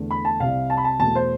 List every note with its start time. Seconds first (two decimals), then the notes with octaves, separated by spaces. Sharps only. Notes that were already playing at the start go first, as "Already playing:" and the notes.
Already playing: E2 D3 A3
0.11 B5
0.25 A5
0.40 C2 C3 G3 F5
0.70 A5
0.77 B5
0.84 A5
1.00 E2 B2 A3 A5
1.15 C5